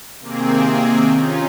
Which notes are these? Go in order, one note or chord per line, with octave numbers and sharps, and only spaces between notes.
C3 D#3 A#3 C4 G#4
C#4 D#4 F4